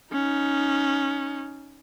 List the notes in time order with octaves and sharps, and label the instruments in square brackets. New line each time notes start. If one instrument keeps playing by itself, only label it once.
[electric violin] C#4 D#4